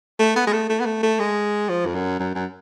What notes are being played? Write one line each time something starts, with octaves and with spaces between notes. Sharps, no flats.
A3
B3
G#3
A3
A3
B3
A3
A3
G#3
F3
F2
F#2
F#2
F#2